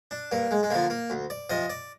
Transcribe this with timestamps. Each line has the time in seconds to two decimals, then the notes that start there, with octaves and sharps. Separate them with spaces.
0.11 D4
0.32 G2 A#3
0.51 G#3
0.63 G#3
0.70 D3 F3 A#3
0.90 A#3
1.10 D2
1.30 D5
1.50 C3 F3 D#5
1.70 D5